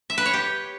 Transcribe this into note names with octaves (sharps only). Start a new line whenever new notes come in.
E5
B4
C#5
G4